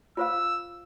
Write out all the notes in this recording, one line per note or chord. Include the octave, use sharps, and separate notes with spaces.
F4 C5 F5 E6